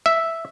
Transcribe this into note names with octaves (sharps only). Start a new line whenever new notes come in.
E5